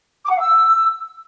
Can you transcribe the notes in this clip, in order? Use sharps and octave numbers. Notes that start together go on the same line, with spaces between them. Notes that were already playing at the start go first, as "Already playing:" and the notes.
D6
F#5
F5
E6